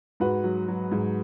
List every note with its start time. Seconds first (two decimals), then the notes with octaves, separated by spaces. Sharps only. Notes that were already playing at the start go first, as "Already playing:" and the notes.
0.20 G#2 F#4 B4
0.44 F#3
0.68 F#3
0.92 G#2